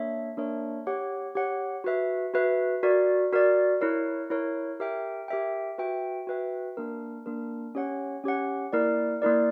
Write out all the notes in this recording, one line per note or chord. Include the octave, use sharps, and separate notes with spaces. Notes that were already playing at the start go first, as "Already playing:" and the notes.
Already playing: A#3 D4 A#4 C#5 E5
A#3 D4 A#4 C#5 E5
G4 C#5 F#5
G4 C#5 F#5
F#4 B4 E5
F#4 B4 E5
F#4 A#4 D5
F#4 A#4 D5
E4 A#4 C#5
E4 A#4 C#5
G4 A#4 E5 G5
G4 A#4 E5 G5
F#4 B4 E5 G5
F#4 B4 E5 G5
A#3 D4 A#4
A#3 D4 A#4
C#4 G4 C#5 F#5
C#4 G4 C#5 F#5
A#3 E4 A#4 D5
A#3 E4 A#4 D5